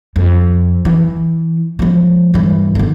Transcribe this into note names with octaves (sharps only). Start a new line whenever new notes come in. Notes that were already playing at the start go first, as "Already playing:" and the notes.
F2
E3
F3 G#3
G2 E3
D3 D#3